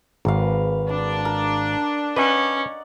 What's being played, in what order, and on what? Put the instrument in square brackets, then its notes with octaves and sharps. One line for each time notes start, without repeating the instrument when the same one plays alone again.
[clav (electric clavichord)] G#1 [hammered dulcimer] A#4 B4 F5
[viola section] D4 [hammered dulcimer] B5
[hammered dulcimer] A#4
[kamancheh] C#4 [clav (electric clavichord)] B4 [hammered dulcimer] D5 D#5 F#5